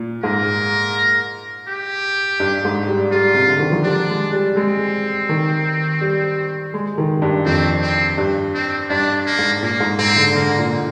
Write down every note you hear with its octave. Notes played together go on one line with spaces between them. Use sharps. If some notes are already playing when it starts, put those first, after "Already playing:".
Already playing: A#2
G#2 A#4
G4
G2
G#2
G3
G3 F4
C3
D3
D#3
F3
G3 D4
G#3
G3
G#3 C4
D#3
G3
G#3
D#3
G2
F2 C4
C4
G2
C4
G2 D4
A#3
G#2
A#2 A#3
G#2
G#2 C4
D3
D3 A#3
A#2